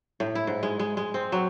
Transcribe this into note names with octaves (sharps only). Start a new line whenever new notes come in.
A2
E4
G#2
G#3
G#3
G#3
C4
F#3